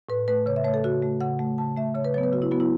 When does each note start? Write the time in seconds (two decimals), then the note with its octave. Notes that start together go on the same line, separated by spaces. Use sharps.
0.09 A2 B4
0.28 A3 B4
0.46 C#3 C#5
0.56 E5
0.64 A3 C#5
0.74 A4
0.84 C#3 F#4
1.02 A3
1.21 C#3 F#5
1.39 A3
1.58 C#3 A5
1.77 A3 E5
1.95 C#3 C#5
2.05 B4
2.14 F#3 C#5
2.18 B3
2.23 B4
2.32 C#3 F#4
2.42 E4
2.51 F#3 B3 F#4
2.60 E4